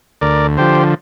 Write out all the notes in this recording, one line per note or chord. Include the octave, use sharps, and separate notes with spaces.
D2 A#4 D5
D3 F3 G4 C5